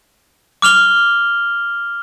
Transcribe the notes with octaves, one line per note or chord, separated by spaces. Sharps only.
D6 F6 F7 G7